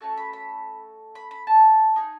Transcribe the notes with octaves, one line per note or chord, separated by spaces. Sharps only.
A3 C#4 F#4 A4 A5
B5
B5
B5
B5
A5
D#4 G#4